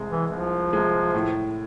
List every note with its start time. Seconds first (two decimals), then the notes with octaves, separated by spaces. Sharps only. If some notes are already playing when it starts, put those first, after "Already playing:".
Already playing: C2 C3 G#3
0.10 E3
0.31 C2 F3
0.73 C3 G#3
1.14 A2